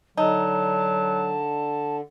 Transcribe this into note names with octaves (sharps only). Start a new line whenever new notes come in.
D3 F#3 D#4 A5